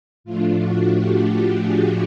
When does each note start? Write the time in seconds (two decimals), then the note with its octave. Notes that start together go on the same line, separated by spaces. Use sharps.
0.24 A2 F3 A3 D4 F4
0.59 F#4
0.94 G4
1.28 G4
1.62 G#4